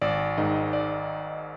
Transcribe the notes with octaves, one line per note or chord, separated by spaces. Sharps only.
G#1 D5
G#2 D#3 D#5
D5